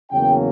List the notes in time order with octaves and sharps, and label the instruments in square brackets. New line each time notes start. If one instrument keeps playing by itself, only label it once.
[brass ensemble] E2 C#3 F#3 A#3 C#4 G5